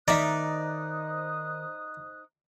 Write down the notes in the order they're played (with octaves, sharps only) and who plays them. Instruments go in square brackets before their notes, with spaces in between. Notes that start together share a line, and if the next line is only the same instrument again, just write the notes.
[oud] D#3 E5 [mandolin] D#4 [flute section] C5 D#6 F#6 [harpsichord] D5